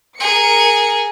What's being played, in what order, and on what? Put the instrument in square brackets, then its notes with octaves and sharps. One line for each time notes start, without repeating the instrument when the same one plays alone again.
[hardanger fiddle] G#4 [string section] A#4 C#7